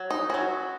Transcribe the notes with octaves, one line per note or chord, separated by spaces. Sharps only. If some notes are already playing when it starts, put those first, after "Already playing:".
Already playing: F#3
D#4
F#3 C#4 F#4